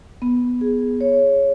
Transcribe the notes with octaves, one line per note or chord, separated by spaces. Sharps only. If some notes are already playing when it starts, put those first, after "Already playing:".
B3
G#4
C#5